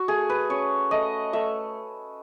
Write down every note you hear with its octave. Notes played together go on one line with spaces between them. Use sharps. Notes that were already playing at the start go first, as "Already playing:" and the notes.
Already playing: F#4
A3 G#4
B4
C#4 C#5
A3 D#5
A3 E5